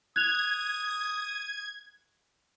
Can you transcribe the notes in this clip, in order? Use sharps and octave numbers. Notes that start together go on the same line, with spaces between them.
D#6 F#6 G#6 F7